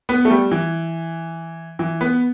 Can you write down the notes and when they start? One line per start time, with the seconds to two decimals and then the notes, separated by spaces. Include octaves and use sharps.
0.09 B3
0.25 A3
0.30 G3
0.51 E3
1.79 E3
2.01 B3